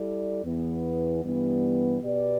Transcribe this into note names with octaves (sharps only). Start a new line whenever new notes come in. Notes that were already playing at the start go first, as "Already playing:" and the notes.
Already playing: G3 E4 A4 D5
E2 E3 B3
G2 E3 G3 B3
B2 B3 G4 B4 D5